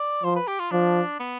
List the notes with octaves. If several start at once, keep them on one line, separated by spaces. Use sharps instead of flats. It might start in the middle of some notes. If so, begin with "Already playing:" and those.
Already playing: D5
F3 C5
B4
G4
F4
F3 D4
B3